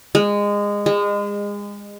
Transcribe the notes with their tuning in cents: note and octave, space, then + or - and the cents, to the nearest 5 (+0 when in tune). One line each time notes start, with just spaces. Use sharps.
G#3 -20
G#3 -30